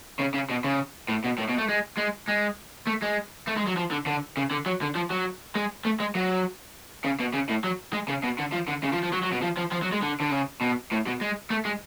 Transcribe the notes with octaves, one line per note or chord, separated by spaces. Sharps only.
C#3
C#3
B2
C#3
A2
B2
A2
B2
A3
G#3
G#3
G#3
A3
G#3
A3
G#3
F#3
F3
D3
D3
C#3
D3
F#3
D3
F3
F#3
G#3
A3
G#3
F#3
C#3
B2
C#3
A2
F#3
G#3
C#3
B2
D3
F3
D3
C#3
F3
F3
F#3
F#3
B2
F3
F3
F3
F#3
G#3
D3
D3
C#3
B2
A2
B2
G#3
A3
G#3